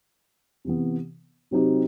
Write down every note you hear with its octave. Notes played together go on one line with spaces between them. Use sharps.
C3 E3 B3
C3 F#3 C4 D#4 G4